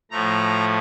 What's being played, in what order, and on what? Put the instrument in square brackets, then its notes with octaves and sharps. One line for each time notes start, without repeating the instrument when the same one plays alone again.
[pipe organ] A2 F3 A3 A#5